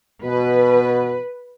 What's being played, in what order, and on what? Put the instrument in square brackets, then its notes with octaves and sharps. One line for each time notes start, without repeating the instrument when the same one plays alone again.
[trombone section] B2 [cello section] B4